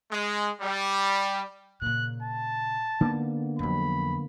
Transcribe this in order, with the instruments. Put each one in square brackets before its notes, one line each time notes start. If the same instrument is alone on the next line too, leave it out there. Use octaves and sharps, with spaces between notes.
[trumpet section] G#3
G3
[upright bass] A#2 C#3 [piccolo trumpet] F#6
[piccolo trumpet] A5
[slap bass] D3 A#3 B3 [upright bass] D#4
[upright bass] F2 F#3 [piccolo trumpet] B5